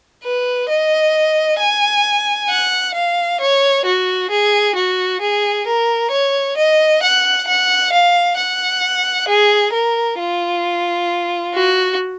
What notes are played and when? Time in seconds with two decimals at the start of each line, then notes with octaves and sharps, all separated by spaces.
0.24 B4
0.69 D#5
1.60 G#5
2.50 F#5
2.94 F5
3.41 C#5
3.85 F#4
4.31 G#4
4.75 F#4
5.21 G#4
5.67 A#4
6.11 C#5
6.57 D#5
7.03 F#5
7.47 F#5
7.92 F5
8.37 F#5
9.28 G#4
9.73 A#4
10.19 F4
11.54 F#4